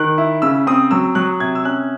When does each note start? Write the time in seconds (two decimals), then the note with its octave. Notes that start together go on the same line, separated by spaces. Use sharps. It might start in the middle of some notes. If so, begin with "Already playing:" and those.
Already playing: D#3 F#6
0.18 E4
0.42 C#3 E6
0.67 C4 D#6
0.91 F#3 E6
1.15 F#3 F#6
1.40 C3 G#6
1.55 E6
1.65 C#4 F#6